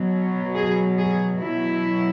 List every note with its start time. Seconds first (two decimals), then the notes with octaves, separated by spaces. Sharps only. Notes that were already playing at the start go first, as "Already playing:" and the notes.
Already playing: B2 F#3
0.54 G#4
0.98 G#4
1.41 B2 F#3 E4